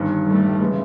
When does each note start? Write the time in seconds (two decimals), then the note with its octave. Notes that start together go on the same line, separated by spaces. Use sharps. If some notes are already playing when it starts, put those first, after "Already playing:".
Already playing: G1 G2 D#3
0.27 G3 A3
0.60 C#3 E3 G#3